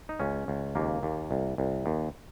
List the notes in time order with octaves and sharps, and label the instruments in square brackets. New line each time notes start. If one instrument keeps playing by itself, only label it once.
[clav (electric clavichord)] D#4
C#2 C#4
C#2
D#2 A#3
D#2
C2
C2
D#2